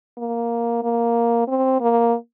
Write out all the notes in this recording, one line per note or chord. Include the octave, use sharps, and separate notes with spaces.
A#3
A#3
C4
A#3